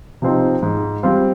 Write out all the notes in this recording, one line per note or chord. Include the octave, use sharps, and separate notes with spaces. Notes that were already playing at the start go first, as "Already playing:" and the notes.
C3 F3 C4 D#4
G#2
G3 C4 F4